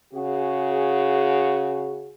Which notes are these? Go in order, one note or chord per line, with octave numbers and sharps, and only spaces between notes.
C#3 F#4 G#4